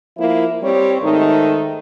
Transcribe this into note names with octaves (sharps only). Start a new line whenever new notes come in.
F3 A#3 E4
G3 C4 G4 C#5
G#2 D#3 A3 D#4